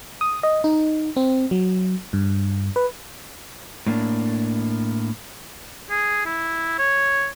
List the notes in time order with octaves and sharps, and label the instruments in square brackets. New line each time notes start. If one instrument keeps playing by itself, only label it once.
[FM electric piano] D#6
D#5
D#4
C4
F#3
G2
B4
[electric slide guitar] A2 A#3 D4
[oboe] G#4
E4
C#5